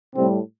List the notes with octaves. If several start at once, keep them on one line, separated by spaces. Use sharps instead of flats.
A2 C3 G3 C4